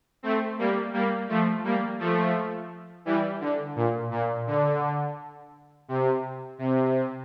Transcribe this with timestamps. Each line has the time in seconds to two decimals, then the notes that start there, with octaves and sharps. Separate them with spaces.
0.23 A3 C4
0.58 G3 A#3
0.93 G3 A#3
1.29 F3 A3
1.64 G3 A#3
1.99 F3 A3
3.05 E3 G3
3.41 D3
3.76 A#2
4.11 A#2
4.47 D3
5.88 C3
6.59 C3